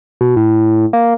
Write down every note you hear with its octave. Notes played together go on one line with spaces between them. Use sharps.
B2
A2
A#3